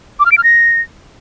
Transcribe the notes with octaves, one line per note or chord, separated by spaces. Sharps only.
D6
F6
D7
F6
A#6